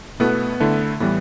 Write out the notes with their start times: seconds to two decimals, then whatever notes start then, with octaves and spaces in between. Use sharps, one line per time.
0.20 B2 A3 B3 E4 A4
0.60 D3 A3 E4 A4
1.00 A2 E3 G3 B3